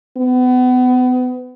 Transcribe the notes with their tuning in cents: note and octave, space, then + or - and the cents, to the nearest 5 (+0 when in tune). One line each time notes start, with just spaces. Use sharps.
B3 +30